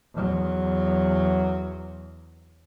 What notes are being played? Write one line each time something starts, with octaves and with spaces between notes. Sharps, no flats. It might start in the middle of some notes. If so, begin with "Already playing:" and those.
E2 F#3